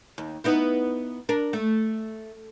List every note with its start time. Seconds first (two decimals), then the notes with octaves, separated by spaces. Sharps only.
0.18 D#2
0.44 B3 D#4 E4
1.29 D4 A#4
1.53 A3